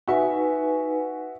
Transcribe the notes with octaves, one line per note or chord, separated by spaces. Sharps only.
D#4 F#4 B4 E5 G#5